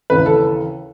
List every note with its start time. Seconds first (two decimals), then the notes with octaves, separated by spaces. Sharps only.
0.10 D#2 C#3 E3 B4
0.26 A4